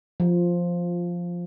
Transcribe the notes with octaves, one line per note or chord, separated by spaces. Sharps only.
F3